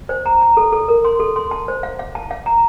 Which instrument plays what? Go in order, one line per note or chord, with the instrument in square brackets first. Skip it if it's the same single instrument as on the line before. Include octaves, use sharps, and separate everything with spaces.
[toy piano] C5
A#5
A#5
A4
A4
A#4
C6
A4
C6
A5
C5
F5
F5
A5
F5
A#5